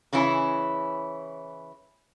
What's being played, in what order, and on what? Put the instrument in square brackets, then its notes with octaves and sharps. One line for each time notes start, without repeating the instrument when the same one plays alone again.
[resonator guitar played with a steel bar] C#3 E3 C#4 E4